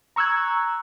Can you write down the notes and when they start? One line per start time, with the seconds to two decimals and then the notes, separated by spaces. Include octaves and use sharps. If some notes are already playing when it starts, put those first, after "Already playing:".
0.16 A#5 C#6 E6 F#6 G#6